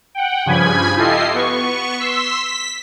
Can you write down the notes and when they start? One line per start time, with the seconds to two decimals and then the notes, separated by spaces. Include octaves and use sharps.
0.15 F#5 G5
0.46 G2 C#3 F3 G#5 B5 G#6
0.96 E4 F4 G4 A4 D#5 C7
1.34 B3 C#6
1.99 C6 E6 B6
2.46 B6